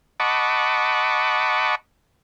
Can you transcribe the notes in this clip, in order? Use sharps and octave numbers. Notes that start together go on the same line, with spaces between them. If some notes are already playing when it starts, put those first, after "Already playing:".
D#5 F#5 A5 B5 C#6 D6